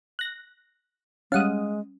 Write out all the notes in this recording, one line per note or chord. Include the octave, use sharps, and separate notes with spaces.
F#6 A#6
G3 G#3 C#4 F5 F#5 D#6